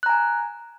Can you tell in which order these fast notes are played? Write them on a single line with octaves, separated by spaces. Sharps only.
F#6 A#5 G#5